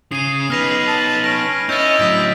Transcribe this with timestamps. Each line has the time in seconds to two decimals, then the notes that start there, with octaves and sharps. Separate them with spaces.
0.12 C#3 G#4 C7 D#7
0.50 B3 D#4 B4 F6 A#6 F7
0.87 A5
1.24 C#4 A#6 D7
1.69 C#4 E4 D#5 G6 A6
2.00 A2 F#3 D#6 B6 D7